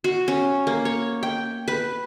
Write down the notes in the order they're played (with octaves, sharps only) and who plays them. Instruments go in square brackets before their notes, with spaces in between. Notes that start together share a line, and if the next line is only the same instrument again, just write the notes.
[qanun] F#4
C#4
A#3
C#5
G5
B4